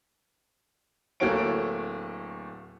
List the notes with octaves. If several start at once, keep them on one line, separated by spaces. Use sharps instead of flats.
D1 A3 A#3 F#4 C#5 D7